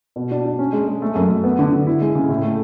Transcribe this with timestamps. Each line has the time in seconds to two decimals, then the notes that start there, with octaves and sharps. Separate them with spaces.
0.16 B2
0.31 D4
0.45 D4
0.59 C#4
0.73 G#3
0.88 G#3
1.02 A3
1.15 F#2
1.31 F#2
1.44 B3
1.59 D3
1.72 D3
1.87 E4
2.01 G#3
2.15 C#3
2.29 A2
2.43 A3